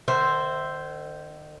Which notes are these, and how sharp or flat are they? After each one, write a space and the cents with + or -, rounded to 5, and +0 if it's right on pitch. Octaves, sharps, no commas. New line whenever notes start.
D#3 -40 C5 +0 E5 +0